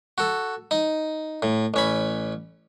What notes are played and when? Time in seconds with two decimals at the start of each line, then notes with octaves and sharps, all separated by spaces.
0.18 F#4 A4
0.71 D#4
1.42 A2
1.74 A1 C#4 B5